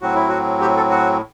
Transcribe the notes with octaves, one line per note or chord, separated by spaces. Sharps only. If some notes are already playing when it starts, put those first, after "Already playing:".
A2 F#3 C4 F#4
E4
F#4
G4
A4
F#4